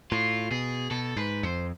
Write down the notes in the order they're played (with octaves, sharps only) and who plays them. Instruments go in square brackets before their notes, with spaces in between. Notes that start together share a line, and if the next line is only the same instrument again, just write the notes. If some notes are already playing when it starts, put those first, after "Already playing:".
[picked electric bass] A2 [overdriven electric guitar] F4
[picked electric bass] B2 [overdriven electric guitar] G#4
[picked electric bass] B2 [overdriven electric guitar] A4
[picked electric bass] G#2 [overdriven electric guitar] B4
[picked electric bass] F2 [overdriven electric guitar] C5